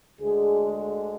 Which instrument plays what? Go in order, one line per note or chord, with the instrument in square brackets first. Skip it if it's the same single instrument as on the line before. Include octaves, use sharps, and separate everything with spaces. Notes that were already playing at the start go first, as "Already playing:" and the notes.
[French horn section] D2 D3 G#3 G#4